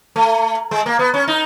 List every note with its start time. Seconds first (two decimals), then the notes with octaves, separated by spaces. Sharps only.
0.16 A3
0.71 G#3
0.86 A#3
0.99 B3
1.14 C#4
1.28 D#4